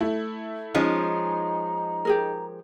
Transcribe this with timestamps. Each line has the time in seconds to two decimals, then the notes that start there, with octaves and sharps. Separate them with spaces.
0.01 A3 E4
0.75 F3 G#3 C#4 D#4 A#5
2.05 G4 G#4 A#4